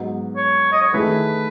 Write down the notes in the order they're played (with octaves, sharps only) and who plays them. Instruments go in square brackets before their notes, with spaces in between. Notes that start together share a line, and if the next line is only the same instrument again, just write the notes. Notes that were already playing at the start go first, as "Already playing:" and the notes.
Already playing: [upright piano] G#2 F#3 B3
[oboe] C#5
D#5
C#5
[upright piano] D#3 A3 E4 G#4 [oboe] B4